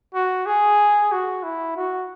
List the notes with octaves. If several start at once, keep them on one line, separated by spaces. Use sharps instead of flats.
F#4
G#4
F#4
E4
F#4